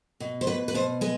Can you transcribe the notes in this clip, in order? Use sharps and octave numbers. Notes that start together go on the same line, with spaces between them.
B2
C5
B2 B4
B4
B2 C5
G#3 B4